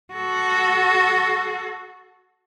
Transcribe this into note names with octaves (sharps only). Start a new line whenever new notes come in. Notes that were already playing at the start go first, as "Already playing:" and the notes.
F#4 A4